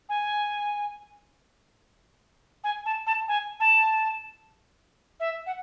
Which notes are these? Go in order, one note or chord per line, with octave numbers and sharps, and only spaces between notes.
G#5
G#5
A5
A5
G#5
A5
E5
F#5